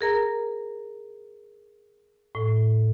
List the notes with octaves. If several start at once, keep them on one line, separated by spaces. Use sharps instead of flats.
G#4 A#4 A#5
A2